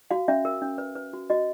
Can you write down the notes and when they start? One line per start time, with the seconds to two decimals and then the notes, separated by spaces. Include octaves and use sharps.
0.11 F#4 F5
0.28 C#4 E5
0.45 A#4
0.62 C#4
0.78 B4
0.96 B4
1.13 F#4
1.30 F#4 D#5